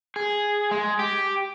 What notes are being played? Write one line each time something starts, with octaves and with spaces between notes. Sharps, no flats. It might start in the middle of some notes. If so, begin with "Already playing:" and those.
G#4
G#3
G4